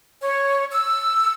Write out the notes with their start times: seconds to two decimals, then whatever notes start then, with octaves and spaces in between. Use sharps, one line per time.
0.22 C#5
0.72 E6